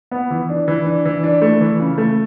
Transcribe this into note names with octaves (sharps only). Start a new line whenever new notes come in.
B3
E3
D4
E3
D4
E3
D4
A3
E3
C#3
A3